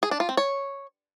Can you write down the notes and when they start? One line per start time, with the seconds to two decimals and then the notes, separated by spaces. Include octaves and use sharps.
0.03 G#4
0.11 D4
0.20 F4
0.29 C4
0.37 C#5